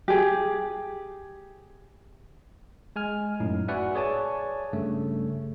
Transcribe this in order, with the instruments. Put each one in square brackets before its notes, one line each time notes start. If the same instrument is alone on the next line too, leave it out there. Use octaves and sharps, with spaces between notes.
[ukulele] G4 G#4
[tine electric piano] G#3 G#5 F6
F#2 A2 D#4
F#4 B4 D5 E5 F#5 G#5
G#4 C#5 D5 G#5 A5
G2 C#3 A3